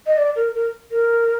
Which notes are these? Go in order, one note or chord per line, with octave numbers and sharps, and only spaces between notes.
D#5
D5
A#4
A#4
A#4